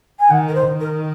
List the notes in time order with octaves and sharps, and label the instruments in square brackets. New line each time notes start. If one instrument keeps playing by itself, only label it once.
[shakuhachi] G#5
[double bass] D#3 [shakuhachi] F#5
[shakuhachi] A#4
C5
[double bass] D#3
[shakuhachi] A#4